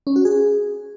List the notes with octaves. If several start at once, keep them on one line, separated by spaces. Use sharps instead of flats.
C#4
F#4
G#4